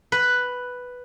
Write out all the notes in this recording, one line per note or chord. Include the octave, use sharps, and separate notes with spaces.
B4